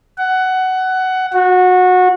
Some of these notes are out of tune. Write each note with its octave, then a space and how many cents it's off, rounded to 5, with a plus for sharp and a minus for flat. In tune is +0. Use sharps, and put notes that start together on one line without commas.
F#5 +15
F#4 -20